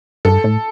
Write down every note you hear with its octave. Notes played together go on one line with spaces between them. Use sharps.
G2 A4
A2